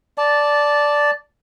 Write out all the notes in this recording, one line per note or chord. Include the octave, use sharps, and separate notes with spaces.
D5 A5